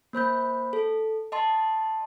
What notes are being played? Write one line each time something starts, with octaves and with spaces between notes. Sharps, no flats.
A#3 C5 B5 G6
A4
D#5 A5 C6